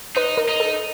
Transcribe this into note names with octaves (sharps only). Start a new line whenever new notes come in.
D#4 B4
A#4
D#4
A4